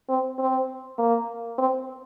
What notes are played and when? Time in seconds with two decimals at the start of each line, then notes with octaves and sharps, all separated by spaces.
0.09 C4
0.39 C4
0.98 A#3
1.58 C4